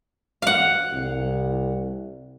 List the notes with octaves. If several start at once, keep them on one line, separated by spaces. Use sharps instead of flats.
F5 F#5
C2